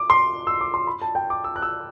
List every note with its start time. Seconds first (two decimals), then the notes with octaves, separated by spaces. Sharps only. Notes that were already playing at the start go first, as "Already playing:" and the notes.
Already playing: D6
0.10 C6
0.47 E6
0.61 D6
0.74 C6
0.87 B5
1.02 A5
1.15 G5
1.30 D6
1.44 E6
1.56 F#6
1.62 E6